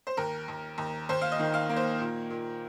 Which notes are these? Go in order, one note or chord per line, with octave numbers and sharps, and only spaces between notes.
C5
D#2 A#4
D#2
D#2
D#2 C5
F5
D#5
D#3
F5
A#3
C5
A#2
A#2